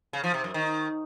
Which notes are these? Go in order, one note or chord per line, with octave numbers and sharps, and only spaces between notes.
C#3
F3
C3
F#2
D#3